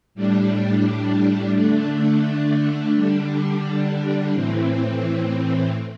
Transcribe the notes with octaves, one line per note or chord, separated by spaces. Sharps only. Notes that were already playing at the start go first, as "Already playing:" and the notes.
A2 G3 D4
D3 A3 D4
D3 G3 D4
A2 E3 C4